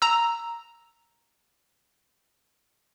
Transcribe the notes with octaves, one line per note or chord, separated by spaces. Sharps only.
A#5 E6